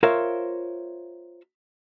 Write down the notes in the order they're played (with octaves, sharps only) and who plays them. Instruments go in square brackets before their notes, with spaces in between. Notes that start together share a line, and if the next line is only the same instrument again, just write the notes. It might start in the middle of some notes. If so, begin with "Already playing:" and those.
[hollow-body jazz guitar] F4 A#4 C5 C#5 E5 F5